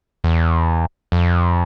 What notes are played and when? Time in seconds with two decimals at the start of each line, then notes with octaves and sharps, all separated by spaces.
0.24 E2
1.12 F2